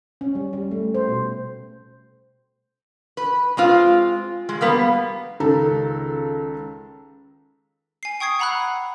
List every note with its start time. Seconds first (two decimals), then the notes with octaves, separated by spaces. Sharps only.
0.21 C#4
0.35 G3
0.53 G3
0.71 A3
0.94 C5
1.09 B2
3.17 B4
3.57 G#3 C4 F4
4.49 G#3
4.61 G3 A#3 B3
5.40 C#2 D#3 A4 A#5
8.03 G#5 C7
8.20 G5 C#6 D#6 G#6 C7
8.40 F#5 A#5 B5 E6 F#6